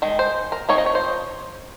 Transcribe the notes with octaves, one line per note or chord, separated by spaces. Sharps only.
D#3 G#3
C5
A#4
F3 C4 D#4 C#5
D#5
C#5
C5